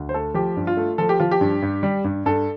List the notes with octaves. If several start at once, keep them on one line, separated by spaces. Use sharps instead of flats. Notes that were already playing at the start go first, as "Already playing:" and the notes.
Already playing: D2
C5
A3 A4
F3 G4
G2
F4
A3
F3 A4
G4
F3 F4
G4
G2
G2
G3
G2
G2 A4